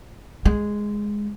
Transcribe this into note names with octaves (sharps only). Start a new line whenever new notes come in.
G#3